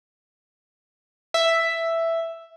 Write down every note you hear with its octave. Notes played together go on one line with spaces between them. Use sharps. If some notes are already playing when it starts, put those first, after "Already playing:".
E5